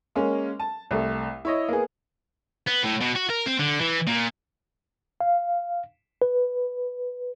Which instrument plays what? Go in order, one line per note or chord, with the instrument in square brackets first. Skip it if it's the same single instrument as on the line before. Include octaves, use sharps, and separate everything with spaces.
[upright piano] G#3 A#3 C#4
A5
C2 A3
E4 C#5 D#5
A#3 B3 G#4
[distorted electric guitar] B3
A2
B2
F#4
A#4
C4
D3
E3
A#2
[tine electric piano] F5
B4